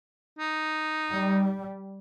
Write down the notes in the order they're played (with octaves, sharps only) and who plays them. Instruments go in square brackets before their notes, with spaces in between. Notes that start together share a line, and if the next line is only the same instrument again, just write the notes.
[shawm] D#4
[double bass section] G3